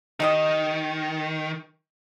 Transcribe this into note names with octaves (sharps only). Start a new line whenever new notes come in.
D#3 D#4 G4 D#5